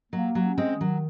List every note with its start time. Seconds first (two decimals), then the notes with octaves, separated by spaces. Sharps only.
0.12 F#3 A#3
0.35 F#3
0.43 C#4
0.58 G#3 C4
0.73 D#3
0.81 F#3